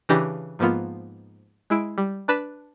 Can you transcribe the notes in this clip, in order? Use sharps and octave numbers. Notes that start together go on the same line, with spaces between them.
C#3 E3 D4 G4 A#6
G#2 F3 A#3 B3 F4
G#3 E4 D7
G3
D4 B4 A5 B6